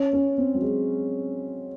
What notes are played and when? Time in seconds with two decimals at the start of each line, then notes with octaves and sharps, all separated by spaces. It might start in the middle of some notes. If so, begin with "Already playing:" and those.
Already playing: C#4
0.13 C#4
0.38 C4
0.54 F#3
0.62 G#3